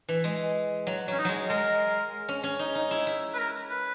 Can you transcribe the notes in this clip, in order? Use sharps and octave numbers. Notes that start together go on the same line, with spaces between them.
E3
G#3
F#3
F#3 C#4
D#4
F#3 G#3
G#3 A#4
C#4
C#4
D#4
D#4
E4
E4
B4
A#4
B4